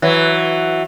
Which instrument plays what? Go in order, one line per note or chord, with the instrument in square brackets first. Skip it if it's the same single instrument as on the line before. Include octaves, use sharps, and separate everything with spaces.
[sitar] E3 F#3